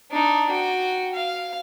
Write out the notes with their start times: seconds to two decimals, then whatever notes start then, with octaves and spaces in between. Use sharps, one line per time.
0.11 D4 D#4
0.50 F#4 G5
1.13 F5